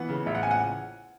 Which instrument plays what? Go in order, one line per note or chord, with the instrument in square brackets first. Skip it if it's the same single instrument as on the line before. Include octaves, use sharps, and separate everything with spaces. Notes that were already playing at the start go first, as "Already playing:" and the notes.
Already playing: [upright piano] E3 B3 F#5
C#3
A1 E5
F#5
G#5
F#5